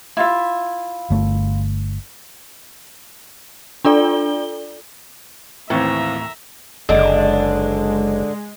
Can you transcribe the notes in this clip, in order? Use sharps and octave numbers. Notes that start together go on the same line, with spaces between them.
E4 F4 E5
G1 A3
D4 F4 A4 D5 G7
D#2 A2 E3 C4 E5 A#5
F#1 D3 G#3 D4 D#5